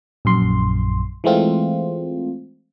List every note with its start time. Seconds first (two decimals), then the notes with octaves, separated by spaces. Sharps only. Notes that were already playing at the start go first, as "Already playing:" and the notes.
0.25 A#1 F#2 C6
1.24 E3 G#3 A3 C4 F4